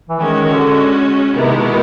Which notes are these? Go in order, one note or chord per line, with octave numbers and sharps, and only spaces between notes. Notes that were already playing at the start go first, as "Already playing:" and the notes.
E3
D#3 G#3 C#4 F#4
D#3
D3
C3 D#3 G#3 B3 E4
B2